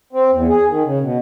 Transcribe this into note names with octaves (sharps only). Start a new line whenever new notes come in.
C4
E2
G#4
D#3
C#3
B2